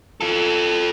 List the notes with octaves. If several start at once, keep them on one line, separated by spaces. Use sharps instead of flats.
F4 A4